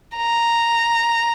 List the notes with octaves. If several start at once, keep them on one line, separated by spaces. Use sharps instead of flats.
A#5